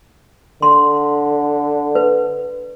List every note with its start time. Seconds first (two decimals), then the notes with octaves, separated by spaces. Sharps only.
0.62 D3 C6
1.95 B4